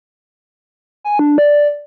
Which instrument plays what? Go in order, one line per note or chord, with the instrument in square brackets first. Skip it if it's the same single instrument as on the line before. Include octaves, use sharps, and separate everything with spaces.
[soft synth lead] G#5
D4
D5